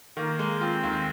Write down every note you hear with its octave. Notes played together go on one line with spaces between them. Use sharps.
D#3 A#3
G#3
C4 F4
D#2